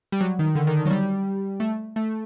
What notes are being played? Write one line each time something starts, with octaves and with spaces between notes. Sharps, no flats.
G3
F#3
D#3
D3
D#3
F#3
G3
A3
A3